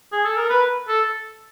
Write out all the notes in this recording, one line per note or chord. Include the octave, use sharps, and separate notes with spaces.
G#4
A4
A#4
B4
A4